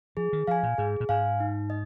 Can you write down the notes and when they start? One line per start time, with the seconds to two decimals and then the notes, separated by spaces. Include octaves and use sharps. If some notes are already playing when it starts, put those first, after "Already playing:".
0.17 F3 G#4
0.33 D#3
0.47 F3 F5 G#5
0.63 A#2
0.78 G#2 G#4
1.00 A#2
1.09 G#2 F5 G#5
1.40 D#4
1.70 D#5